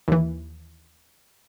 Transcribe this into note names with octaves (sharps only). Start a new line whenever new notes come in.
D#2 E3